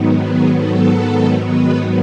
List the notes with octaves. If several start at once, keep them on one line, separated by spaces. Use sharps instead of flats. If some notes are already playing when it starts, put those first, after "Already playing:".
Already playing: G#2 D#3 F#3 B3
G#4
A4
B4